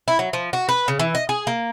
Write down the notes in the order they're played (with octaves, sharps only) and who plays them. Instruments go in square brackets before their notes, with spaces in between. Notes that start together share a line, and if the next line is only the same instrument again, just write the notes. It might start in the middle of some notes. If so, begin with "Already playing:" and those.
[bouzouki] E4
F#3
F3
F#4
B4
C#3
E3
D#5
G#4
A#3